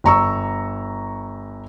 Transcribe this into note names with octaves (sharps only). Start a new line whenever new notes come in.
G1 A#5 C#6 E6